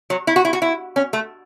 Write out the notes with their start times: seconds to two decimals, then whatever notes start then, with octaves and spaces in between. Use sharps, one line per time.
0.10 F#3
0.27 E4
0.36 F#4
0.45 E4
0.53 F#4
0.62 E4
0.96 C#4
1.13 A3